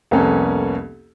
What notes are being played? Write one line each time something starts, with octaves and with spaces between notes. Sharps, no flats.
C2 F2 A#3 B3 C#4 A4